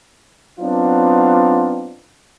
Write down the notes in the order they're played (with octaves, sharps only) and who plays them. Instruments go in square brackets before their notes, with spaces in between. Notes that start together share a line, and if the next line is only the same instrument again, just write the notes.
[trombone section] F#3 B3 C4 D4 D#4 F4